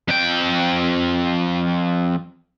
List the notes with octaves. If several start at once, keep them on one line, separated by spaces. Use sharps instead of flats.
F2 G5